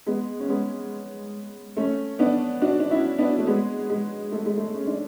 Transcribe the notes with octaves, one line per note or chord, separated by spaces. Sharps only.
G#3 B3
C#4
G#3 B3
A3 C#4
B3 D4
D4 F#4
D4
C#4 E4
B3 D4
A3
G#3 B3
G#3
A3
G#3
A3
C#4
D4